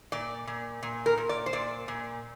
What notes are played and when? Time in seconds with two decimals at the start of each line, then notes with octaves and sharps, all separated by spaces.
0.12 A#2 D5
0.47 A#2
0.83 A#2
1.06 A#4
1.18 A#2
1.29 D5
1.46 C5
1.53 A#2 D5
1.88 A#2